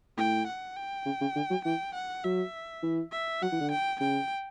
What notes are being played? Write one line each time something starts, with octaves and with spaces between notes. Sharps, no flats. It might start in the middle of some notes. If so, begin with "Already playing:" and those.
A2 G5
F#5
G5
C#3
C#3
D3
F#3
E3 G5
F#5
F#3 E5
E3
E5
F#3 F#5
E3
D3
G5
C#3 G5